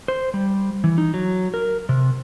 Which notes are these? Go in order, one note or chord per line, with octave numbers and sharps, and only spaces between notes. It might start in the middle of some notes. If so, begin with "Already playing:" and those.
C5
G3
E3
D#4
F#3
A#4
C3